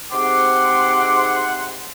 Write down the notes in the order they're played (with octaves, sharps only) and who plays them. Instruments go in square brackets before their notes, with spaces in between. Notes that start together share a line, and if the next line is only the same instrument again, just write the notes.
[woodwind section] G#2 C3 C6 [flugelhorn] F#5 [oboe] D6